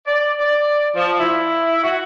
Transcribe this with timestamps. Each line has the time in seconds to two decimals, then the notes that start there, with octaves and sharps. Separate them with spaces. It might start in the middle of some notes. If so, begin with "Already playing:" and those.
0.05 D5
0.39 D5
0.94 F3
1.18 E4
1.83 F#4